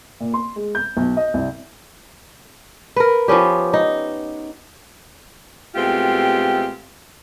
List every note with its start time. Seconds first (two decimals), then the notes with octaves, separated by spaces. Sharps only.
0.20 A#2
0.34 C6
0.56 G#3
0.75 G6
0.97 B1
1.17 D#5
1.34 C2
2.96 A#4 B4
3.28 F3 B3 C#4 G4
3.73 D#4
5.75 B2 G#3 A3 C4 F4 G4